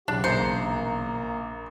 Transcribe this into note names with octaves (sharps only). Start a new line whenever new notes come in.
B1 E2 C#3 D4 F#4 G4
A#1 A#3 C5 A#5 C#7